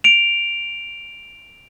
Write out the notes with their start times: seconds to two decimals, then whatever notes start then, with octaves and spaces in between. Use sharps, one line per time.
0.04 D7 F7